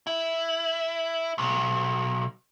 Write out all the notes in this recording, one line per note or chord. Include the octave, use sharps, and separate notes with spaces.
E4
B1